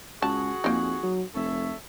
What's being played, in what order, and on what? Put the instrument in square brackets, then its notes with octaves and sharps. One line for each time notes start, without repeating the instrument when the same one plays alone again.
[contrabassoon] C#2 [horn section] F#4 G#4 [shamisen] A5
[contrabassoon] F2 [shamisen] A#3 D#4
[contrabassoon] F#3
[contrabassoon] F1 [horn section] A4 C#5 E5